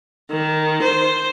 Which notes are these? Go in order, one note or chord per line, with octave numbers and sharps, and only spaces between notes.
D#3
C5